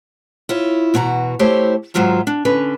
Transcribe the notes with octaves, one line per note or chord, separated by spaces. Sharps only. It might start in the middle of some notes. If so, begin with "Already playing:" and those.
E4 F4 C#5
E2 B2 F#4 A5 A#5
A3 E4 G4 C5 C#5
G#2 D#3 F#3 F4 E5 A#5
D4
D3 C#4 B4